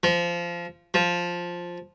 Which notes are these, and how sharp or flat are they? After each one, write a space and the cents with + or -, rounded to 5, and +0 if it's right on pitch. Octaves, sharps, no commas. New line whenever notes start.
F3 -15
F3 +5